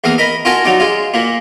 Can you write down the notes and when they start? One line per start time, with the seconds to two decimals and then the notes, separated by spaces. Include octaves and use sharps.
0.04 E2 A#3 F5 D#6
0.18 A#4 D#5 B5
0.45 F4 F#4 A#4 D#5 G#5 A5
0.65 F#3 D#4 D5
0.80 G#3 F4
1.14 A#2 A#3